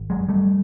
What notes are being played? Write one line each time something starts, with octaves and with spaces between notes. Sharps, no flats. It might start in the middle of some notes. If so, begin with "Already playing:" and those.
Already playing: G#1
F#3 G#3
G2
G3 A3